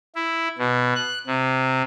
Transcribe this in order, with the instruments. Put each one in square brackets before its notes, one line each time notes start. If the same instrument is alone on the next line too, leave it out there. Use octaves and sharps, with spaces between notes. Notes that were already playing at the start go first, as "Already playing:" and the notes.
[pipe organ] E4
B2
F#6
C3